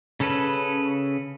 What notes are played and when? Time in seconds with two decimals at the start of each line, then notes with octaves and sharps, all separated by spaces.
0.20 C#3 C#4 A4 B4